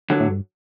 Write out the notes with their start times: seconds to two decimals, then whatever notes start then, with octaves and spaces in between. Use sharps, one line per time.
0.10 D3 F#3
0.20 A2
0.28 G2